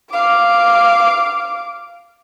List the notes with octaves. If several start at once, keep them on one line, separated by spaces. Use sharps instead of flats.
F5 D6